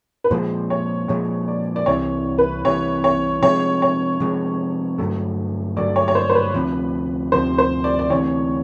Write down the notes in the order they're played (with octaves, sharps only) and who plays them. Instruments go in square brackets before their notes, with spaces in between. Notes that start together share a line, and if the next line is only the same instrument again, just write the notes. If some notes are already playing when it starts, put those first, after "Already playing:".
[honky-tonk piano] B4
[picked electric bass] A#2 F3 G#3 [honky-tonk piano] C5
[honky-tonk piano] C#5
[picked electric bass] A#2 F3 G#3 [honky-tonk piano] C#5
[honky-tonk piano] D5
D5
[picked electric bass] C2 C3 E3 [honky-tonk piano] C#5
[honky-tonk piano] B4
[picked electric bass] C2 C3 E3 [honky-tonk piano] C#5
[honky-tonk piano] C#5
[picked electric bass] C3 F3 G#3 [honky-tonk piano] C#5
[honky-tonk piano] C#5
[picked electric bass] C3 F3 G#3
G2 D3 F#3 A3
[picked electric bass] G2 D3 F#3 A3 [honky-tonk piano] D5
[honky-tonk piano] C#5
C#5
C5
C5
B4
[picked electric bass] D2 C3 F3
[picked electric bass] D2 C3 F3 [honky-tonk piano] C5
[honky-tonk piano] C5
D5
D5
[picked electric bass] D2 C3 E3 [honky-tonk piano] C#5